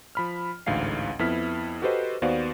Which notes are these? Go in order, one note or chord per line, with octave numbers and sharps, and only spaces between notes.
F3 B5 F6
A1 D2 G#2 F5 C7
F2 B3 E4 F6 B6
F#4 G4 A4 B4 C5 D#5
D#2 B3 F#4 C5 D5 F5